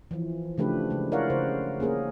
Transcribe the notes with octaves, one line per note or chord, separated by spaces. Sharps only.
E3 F3
C#3 F3 A3 D4 G4 B4
C#3 G#3
E4 A#4 C#5 D5 F5 F#5
C#3 C5
A#3 C#4 G#4 A#4